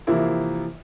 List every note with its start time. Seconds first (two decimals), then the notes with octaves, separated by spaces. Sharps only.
0.07 C3 E3 F3 A#3 E4 A#4